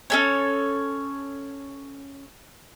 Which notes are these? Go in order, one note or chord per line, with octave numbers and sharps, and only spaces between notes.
C#4 A4 C#5